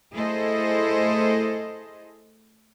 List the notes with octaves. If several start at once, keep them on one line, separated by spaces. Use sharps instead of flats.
A3 E4 G#4 A4 C5 D#5